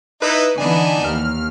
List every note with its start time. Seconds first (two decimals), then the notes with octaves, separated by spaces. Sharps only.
0.22 D#4 E4 B4
0.58 D3 E3 B3 D4 D#4 G#5
1.04 D#2 F6